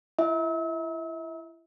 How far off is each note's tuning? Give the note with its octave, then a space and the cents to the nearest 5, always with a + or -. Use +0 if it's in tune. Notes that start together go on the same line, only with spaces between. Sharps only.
E4 +30 E5 -40